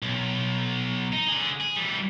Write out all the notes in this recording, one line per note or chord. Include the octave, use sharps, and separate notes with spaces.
B1
D#4
D3 G#4
G#4
E3 G3